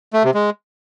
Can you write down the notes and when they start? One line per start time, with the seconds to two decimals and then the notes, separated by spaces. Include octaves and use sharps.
0.13 A3
0.24 C3
0.34 G#3